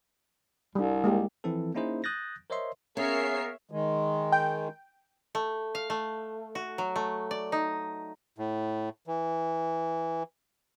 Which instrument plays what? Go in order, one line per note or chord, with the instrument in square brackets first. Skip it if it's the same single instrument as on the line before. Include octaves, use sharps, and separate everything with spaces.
[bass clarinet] C2 [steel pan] G3 D4
[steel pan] G#3 A#3 G4
[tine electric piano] E3 F3 C4 E4 A4
A#3 C#4 D#4 E4 G#4 C5
D#6 F#6 G6 A6 A#6
A#4 C5 C#5 D#5 E5 C6
[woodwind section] A#3 B3 A#4 [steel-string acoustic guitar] C#4 [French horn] G#4 [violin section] C#5 E5 C7
[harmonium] D#3 G#3
[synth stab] G5
[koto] A3
F5
A3
F#4
F#3
A3
D5
D#4
[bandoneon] A2
E3